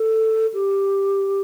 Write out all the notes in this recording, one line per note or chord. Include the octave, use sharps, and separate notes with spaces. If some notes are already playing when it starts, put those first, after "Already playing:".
Already playing: A4
G4